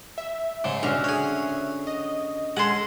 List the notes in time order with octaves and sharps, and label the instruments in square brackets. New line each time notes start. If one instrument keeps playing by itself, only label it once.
[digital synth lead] E5
[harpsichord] G#2 C#3
[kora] D3 C#4 F5 [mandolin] F#4 F6
[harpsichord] G#4 C#5
[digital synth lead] D#5
[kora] G#3 [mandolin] C#4 C6 [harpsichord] A4 F#5